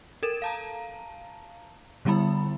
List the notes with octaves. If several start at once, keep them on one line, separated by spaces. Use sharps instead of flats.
A4 A#4 E7
F5 A5 A#5
D3 G3 B3 E4 B5